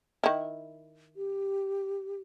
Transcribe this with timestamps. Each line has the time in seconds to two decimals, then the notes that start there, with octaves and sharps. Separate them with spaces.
0.24 D#3 E4
1.16 G4